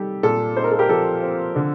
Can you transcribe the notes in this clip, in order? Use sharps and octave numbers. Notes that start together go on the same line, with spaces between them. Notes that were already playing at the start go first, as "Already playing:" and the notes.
Already playing: D#3 G3 G4 A4
A#2 A4
D#4 C5
A#4
A4
G4 A#4
F3 A4
C4
D3